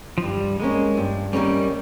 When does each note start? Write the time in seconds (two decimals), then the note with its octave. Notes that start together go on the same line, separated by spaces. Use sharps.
0.18 F3
0.23 G2 G3
0.60 D#3 G#3 A#3 C#4
0.97 G2
1.33 D#3 G3 A#3 C#4